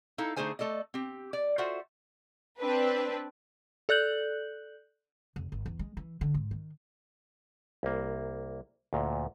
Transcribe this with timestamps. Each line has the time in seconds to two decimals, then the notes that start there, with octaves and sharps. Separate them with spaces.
0.18 D#4 E4 A4 F5
0.36 D3 A3 D#4 G#4 C5 G#5
0.59 A3 A4 D5 D#5
0.94 C4 G4
1.33 D5
1.58 F4 F#4 A4 C5 E5 F#5
2.59 C4 D4 B4
3.89 A4 D5 F#6 G6 F#7
5.36 F1
5.52 G#1
5.66 E2
5.79 G#3
5.97 E3
6.21 D3
6.34 G#2
6.51 D#3
7.83 C2 A#3
8.93 D2 A#2